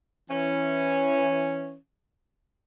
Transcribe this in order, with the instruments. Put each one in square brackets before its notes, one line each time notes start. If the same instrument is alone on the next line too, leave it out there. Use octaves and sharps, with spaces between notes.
[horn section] E3 C#4